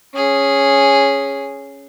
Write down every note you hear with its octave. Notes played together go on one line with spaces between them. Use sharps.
C#4 G#4